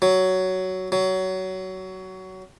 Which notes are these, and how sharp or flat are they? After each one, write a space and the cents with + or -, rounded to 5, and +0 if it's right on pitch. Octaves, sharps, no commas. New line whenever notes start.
F#3 +10
F#3 +20